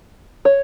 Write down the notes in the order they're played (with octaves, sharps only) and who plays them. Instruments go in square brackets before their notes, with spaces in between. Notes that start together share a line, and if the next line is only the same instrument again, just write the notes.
[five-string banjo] C#5